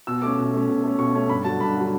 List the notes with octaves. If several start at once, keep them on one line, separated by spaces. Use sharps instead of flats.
B2 E6
A3 C#4 D6
B2
A3 C#4
B2
A3 C#4
B2 C#6
A3 C#4
G2 B5
D3 F#3 A5
G2 B5
D3 F#3